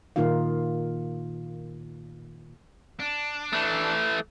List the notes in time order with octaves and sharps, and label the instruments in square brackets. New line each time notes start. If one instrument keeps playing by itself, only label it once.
[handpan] A#2 D#3 A#3 D#4 F4 F5
[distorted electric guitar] D4
[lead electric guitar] E3 A3